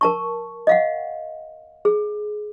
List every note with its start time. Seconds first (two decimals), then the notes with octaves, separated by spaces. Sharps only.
0.01 A#4 A5 C#6
0.67 D#5 F5 F#5
1.85 G#4